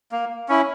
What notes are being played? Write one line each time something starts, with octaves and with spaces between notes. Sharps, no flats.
A#3
C#4 E4